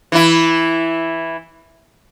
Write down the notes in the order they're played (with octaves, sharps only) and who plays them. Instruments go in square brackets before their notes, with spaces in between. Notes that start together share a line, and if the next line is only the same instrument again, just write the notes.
[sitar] E3 E4